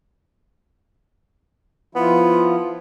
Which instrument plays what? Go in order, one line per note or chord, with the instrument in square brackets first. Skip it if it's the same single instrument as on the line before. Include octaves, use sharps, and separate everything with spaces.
[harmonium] F3 E4 F4 [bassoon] B3